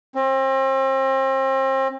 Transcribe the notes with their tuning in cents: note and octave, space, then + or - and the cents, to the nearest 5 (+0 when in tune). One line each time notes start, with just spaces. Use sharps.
C4 +35